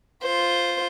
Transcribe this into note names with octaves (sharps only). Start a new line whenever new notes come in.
F4 C5